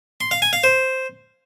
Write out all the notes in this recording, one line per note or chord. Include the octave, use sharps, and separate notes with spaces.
C6
F5
G#5
F5
C5